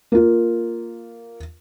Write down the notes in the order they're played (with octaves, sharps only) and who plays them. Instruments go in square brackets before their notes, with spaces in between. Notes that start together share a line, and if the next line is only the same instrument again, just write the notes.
[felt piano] A#3 F4